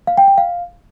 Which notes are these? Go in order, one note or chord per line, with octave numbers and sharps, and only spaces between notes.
F5
G5
G5
F5